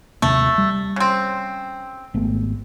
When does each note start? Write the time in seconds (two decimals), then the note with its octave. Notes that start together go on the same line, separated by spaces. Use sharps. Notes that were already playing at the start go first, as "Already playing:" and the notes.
0.22 D#2 C3 A3 A#3
0.58 G3
0.96 C#3 C4
2.14 G#1 A3 B3